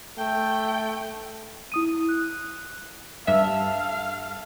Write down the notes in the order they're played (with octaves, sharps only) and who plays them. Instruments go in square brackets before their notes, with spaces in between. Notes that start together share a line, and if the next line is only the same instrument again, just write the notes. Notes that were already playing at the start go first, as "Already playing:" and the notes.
[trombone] A3 [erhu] G5
[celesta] E4 D#6 D#7
F#6
[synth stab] G2 E5 [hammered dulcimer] A4 [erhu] F5